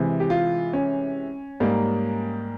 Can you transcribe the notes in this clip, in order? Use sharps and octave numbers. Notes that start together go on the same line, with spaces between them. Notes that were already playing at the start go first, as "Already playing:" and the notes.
Already playing: C3 E3 G#3
G4
F4
C#4
G#2 G3 A#3